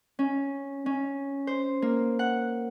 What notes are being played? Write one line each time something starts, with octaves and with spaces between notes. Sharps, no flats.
C#4
C#4
C5
A#3
F#5